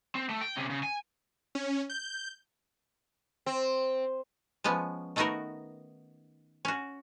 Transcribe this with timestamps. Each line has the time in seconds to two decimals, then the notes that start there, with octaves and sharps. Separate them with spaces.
0.15 C4
0.29 A3
0.41 G5
0.57 C3 C#4
0.70 C#3
0.83 G#5
1.55 C#4
1.90 G6
3.46 C4
4.64 F3 G#3 B3 C#4
5.16 D#3 A3 B3 D#4 F#4 A#4
6.65 C#4 F#4